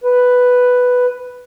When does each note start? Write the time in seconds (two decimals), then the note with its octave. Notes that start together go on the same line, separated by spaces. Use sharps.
0.04 B4